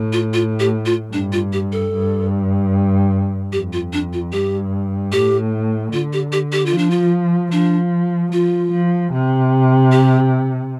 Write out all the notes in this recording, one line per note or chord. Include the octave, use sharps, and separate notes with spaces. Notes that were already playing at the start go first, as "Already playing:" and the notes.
Already playing: A2
F4
F4
G4
F4
G2 D4
F4
G4
A4
G2
F2 G4
F4
D4
F4
G2 G4
A2 G4
D3 F4
G4
G4
G4
F4
F3
D4
F4
F3 D4
F3 F4
F3
C3
G4